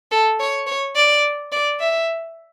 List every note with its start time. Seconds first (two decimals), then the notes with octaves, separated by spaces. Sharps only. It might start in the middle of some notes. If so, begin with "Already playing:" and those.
0.11 A4
0.40 C#5
0.67 C#5
0.96 D5
1.52 D5
1.80 E5